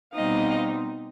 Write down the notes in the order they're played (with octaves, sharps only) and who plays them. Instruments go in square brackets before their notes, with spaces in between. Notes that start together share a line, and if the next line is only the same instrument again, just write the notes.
[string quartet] B2 G3 C4 D#4 D#5 F5